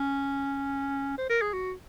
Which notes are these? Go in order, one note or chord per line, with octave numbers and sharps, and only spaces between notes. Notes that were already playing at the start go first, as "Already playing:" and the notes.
Already playing: C#4
C5
A#4
G#4
F#4